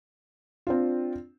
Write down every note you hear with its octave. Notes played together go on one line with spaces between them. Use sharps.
C4 D4 F4